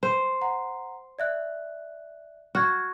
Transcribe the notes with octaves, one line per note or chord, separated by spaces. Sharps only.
C5
F#5 A#5
D5 E5 F#6
F#4 F6 G#6